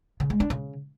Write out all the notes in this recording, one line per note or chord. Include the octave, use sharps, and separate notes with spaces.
C#3
G#3
D4
C#3